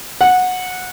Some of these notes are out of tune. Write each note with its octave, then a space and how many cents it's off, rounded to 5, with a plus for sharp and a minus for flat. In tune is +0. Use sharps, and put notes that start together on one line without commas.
F#5 -15